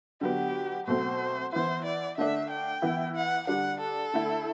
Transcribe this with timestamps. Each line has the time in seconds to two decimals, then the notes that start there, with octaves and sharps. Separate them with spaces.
0.21 D3 F#3 B3 G4
0.87 B2 F#3 A3 C4 C5
1.52 E3 B3 E4 C5
1.85 D5
2.18 D3 A3 D4 E5
2.50 G5
2.82 E3 B3 E4
3.16 F#5
3.47 D3 G3 D4 F#5
3.80 A4
4.14 D3 A3 E4